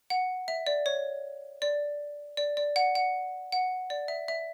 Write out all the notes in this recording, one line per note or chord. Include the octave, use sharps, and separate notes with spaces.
F#5
E5
D5
C#5
D5
D5
D5
F#5
F#5
F#5
D5
E5
E5